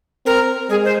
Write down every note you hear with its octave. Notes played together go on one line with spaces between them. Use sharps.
C4 A#4
G#3 G#4
C5